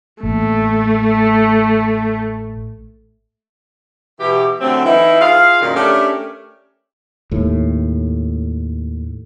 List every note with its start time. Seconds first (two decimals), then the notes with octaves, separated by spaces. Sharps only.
0.23 A1 A3 A#3
4.20 B2 E3 G4
4.60 D3 F#3 A3 C4
4.84 E3 D#4 E4
5.21 F4 G#4 F5
5.61 F#2 A#2 D#3
5.75 A3 C#4 D4 G4 A#4
7.31 D#2 A2